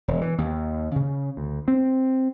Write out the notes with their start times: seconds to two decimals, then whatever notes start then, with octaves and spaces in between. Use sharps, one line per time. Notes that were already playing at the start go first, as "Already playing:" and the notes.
0.08 E1
0.21 E3
0.38 D#2
0.96 C#3
1.37 D2
1.68 C4